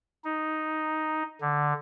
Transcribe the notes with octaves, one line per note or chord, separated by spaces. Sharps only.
D#4
D3